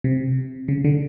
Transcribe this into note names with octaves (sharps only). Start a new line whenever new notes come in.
C3
C#3
D3